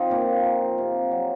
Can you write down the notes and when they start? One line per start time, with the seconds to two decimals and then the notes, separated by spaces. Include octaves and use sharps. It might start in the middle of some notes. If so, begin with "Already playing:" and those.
Already playing: F3 C4 D#4 F4
0.10 A#2 A#3
0.44 F3
0.78 C3
1.11 F#3